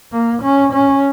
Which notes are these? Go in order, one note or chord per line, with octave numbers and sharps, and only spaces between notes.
A#3
C#4
C#4